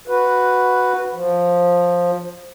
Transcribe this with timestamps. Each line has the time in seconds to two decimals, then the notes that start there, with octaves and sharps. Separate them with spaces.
0.08 F#4 B4
1.14 F3